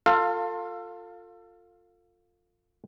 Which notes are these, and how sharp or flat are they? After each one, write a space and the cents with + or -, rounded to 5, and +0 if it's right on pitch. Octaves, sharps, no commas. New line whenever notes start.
F4 +15 A4 +30 F5 +0